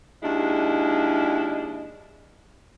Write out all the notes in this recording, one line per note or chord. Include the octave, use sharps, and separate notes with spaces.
D#2 G#3 D4 E4